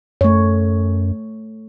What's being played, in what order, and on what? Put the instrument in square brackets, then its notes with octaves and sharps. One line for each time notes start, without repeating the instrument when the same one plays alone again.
[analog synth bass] F#2 [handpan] A3 C#5